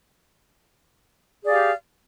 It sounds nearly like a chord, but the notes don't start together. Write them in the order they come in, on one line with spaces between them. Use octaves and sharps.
G#4 D5 F5 G4